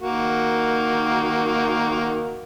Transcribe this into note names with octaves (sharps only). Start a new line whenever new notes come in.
D#3 A#3 F#4